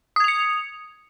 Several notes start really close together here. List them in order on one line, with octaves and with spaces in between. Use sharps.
D#6 G#6 F7 C#7